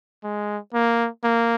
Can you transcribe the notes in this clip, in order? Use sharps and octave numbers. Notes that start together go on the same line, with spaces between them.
G#3
A#3
A#3